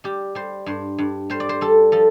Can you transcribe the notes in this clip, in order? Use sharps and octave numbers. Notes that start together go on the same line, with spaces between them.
G3 G4
G3 C5
G2 C5
G2
G3 C5
D5
C5
G3 A4
F3 A4